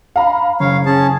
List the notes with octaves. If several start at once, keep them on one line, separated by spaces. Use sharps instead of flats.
F5 A#5 B5
F#1 C#5 F5
C#4 G#4 A5